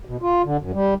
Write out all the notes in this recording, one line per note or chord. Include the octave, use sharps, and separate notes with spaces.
B2
F4
D3
F#2
G3